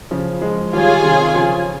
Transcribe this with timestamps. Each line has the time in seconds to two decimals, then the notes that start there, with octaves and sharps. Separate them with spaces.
0.11 C#3 F3
0.42 F3 G#3
0.73 D#3 G3 F4 G#4 C#5 G#5
1.04 C3 D#3
1.35 C#3 F3